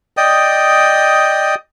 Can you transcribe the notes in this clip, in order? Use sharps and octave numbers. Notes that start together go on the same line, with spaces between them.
D5 D#5 G5 D#6